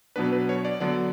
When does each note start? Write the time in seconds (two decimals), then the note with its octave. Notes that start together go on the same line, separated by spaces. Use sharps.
0.16 B2 F#3 B3 D4 B4
0.32 B4
0.49 C#5
0.65 D5
0.80 D3 F#3 B3 D4 D5